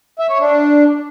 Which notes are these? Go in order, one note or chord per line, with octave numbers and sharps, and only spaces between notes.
E5
C#5
D4